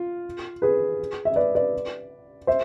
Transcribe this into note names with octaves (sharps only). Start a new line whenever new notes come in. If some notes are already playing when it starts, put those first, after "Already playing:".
Already playing: F4
G#4 B4
E5
B4 D5
B4 D5
C5 E5